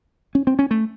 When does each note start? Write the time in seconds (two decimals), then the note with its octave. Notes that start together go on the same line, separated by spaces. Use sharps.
0.35 C#4
0.47 C4
0.59 C#4
0.71 A3